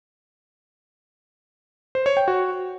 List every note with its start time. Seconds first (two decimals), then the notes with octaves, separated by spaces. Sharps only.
1.95 C5
2.06 C#5
2.17 G5
2.28 F#4